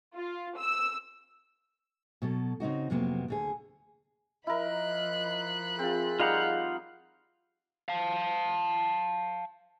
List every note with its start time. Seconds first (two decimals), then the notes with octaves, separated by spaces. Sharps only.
0.15 F4
0.58 E6
2.22 B2 F#3 A4
2.60 C#3 C4 D#4 F#4
2.90 F2 C3 F#3 A#3 B3
3.28 D2 D3 G#4
4.47 F3 E4 A#4 D#5 B5 F#6
5.79 C4 F4 G#4
6.20 G3 D#4 F4 F5 F#5
7.89 F5 A5